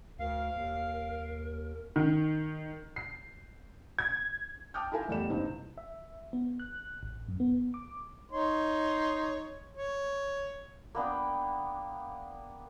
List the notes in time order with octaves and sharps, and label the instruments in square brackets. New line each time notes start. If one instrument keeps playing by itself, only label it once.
[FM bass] D2 [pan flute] A#4 [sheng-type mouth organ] F5
[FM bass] D#2
[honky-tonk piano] D#3
C7
G#6
[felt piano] G5 A5 D6 D#6 F6 G6
E4 F4 A4 A#4 E5 G#5
A1 E2 G3 A3 E7
G2 C3 E3 A#3 C4 D#4
[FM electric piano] E5
B3
F#6
A1
F#2
B3
D6
[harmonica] D#4 C#5 C6
C#5
[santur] A#3 B3 D4 G5